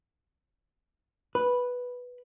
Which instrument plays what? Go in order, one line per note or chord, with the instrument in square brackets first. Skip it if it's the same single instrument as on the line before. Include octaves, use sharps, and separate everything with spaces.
[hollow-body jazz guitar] B4